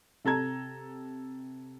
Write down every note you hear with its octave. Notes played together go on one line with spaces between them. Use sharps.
C3 A4 A#5 G#6